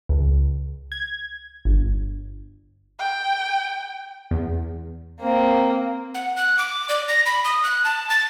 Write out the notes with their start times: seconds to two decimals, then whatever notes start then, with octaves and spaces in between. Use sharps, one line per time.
0.09 C#2
0.92 G#6
1.65 G1
2.99 G5
4.31 E2
5.20 A#3 C4
6.14 F#5
6.36 F#6
6.58 D6
6.89 D5
7.08 A#6
7.26 B5
7.45 D#6
7.64 F#6
7.85 A5
8.10 A6